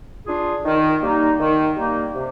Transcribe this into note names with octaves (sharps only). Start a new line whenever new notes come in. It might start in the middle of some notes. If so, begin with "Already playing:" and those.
D4 F4 G#4
D#3
G3 A#3 D#4
D#3
G3 A#3 D#4
C3